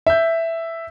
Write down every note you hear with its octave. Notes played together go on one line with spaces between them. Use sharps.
E5 G6